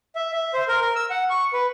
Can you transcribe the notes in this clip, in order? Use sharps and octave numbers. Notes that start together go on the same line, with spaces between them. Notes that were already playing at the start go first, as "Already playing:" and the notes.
E5
E5
C5
A#4
A#4
E6
F#5
C#6
B4